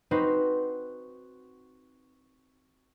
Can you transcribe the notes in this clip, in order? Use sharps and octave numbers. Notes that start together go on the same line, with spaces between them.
C4 D#4 F#4 B4 C5